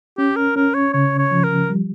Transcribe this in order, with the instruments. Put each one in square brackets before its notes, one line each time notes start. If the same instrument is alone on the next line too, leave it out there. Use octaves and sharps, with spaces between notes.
[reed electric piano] C#4 [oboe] G4
[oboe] A#4
[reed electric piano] C#4 [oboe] A#4
[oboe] C#5
[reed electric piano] C#3 [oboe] C#5
[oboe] C#5
[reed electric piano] F3
[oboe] A#4
[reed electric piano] G3